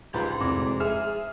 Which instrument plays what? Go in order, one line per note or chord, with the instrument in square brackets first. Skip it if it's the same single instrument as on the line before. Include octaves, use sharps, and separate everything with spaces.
[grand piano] C#2 [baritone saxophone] G#2 [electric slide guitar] G4 B4 F#5
[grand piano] F1 [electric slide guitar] C4 E4 F#4 [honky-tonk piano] D6
[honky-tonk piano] G#4 [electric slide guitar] E5 [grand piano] F6